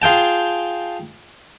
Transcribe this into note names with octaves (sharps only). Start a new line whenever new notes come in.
F4 G#4 G5 A5